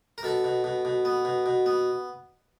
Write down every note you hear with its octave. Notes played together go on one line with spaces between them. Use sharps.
A#4
B2 A4
B2
B2
B2
B3
B2
B2
B3